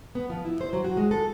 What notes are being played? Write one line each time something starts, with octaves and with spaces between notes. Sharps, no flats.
B3
F3
E4
C5
F#3
F#4
G#3
A4